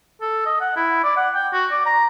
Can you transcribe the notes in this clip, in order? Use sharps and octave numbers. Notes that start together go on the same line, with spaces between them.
A4
D#5
F#5
E4
D5
F#5
G5
F#4
D5
A#5